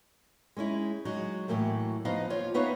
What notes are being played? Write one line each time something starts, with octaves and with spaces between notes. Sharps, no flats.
G#3 C#4 D#4 E4
F#3 G#3 D#4
A2 E3 F#3 A3 A#3
F3 B3 D#4 B4 D#5 F5
D#2 F4 C#5
B3 D#4 B4 C#5 E5 F5